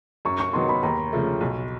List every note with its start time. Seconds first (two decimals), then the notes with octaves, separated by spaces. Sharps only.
0.25 F#2 C#6
0.40 C#6
0.53 D#3 F#3 B3 D#4 C6
0.69 B5
0.83 D#2 A#5
1.13 C#3 F3 A3
1.41 B1